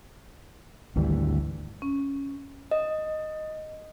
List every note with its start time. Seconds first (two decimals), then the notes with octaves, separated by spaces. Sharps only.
0.96 G#1 D2 E3 G3
1.82 C#4
2.71 D#5